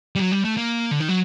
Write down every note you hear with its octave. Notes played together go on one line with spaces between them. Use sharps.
G3
F#3
G3
A3
A#3
D3
D#3
F#3